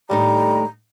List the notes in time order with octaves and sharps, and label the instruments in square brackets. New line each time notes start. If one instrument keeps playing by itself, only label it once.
[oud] D#2 A2 D#4 [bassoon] G3 [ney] A#5